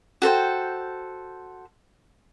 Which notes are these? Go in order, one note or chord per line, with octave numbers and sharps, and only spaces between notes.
F#4 A4 C5 G5